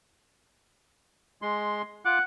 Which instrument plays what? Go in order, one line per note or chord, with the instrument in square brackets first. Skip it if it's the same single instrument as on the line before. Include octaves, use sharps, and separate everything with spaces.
[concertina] G#3 C6
[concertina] F4 D6 [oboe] F#5